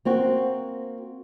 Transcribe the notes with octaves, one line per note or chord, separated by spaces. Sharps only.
A#3 C4 F#4